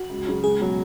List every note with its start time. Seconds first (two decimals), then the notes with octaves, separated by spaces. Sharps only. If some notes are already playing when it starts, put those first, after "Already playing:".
Already playing: F#4
0.09 C#2
0.26 C#3 F#3
0.44 C#2 G#4
0.60 B2 F#3